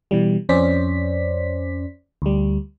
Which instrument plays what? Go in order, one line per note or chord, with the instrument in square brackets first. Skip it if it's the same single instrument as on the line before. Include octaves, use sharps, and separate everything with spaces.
[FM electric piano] B2 E3 G3
F2 C#4 C5 D5 B6
D2 G3